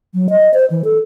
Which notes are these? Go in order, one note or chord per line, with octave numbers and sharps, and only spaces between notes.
F#3
D#5
C5
E3
A4